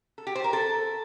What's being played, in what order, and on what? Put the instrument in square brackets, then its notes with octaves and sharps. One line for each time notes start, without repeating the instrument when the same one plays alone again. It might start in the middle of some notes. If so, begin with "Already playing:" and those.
[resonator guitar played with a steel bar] A4
G4
C5
A#4
A4